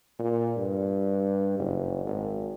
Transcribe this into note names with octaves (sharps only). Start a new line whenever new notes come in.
A#2
G2
F#1
G#1